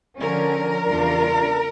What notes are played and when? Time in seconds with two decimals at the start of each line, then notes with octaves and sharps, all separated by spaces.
0.19 D3 F3 C#4 A#4
0.85 E2 C#3 G3 D4 F4